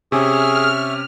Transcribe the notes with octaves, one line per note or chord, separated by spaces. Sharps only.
C3 C#4 G#4 E5 C#6 F6